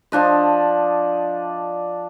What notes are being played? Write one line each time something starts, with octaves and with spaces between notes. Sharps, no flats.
F3 D4 D#5